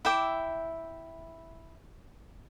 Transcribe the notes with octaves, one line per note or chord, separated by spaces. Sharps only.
E4 E5 G5 D6